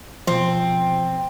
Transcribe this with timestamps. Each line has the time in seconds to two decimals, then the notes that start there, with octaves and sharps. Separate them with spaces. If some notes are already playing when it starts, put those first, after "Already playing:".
0.27 B2 F3 C4